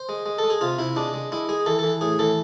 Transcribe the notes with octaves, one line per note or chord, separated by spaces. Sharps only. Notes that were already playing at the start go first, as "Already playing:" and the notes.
Already playing: C5
G#3
G#3
A4
G#3
G#4
C3 F4
C3 E4
G#3 D4
G#3
G#3 E4
G#3 G#4
E3 A4
E3 A4
A2 G#4
E3 A4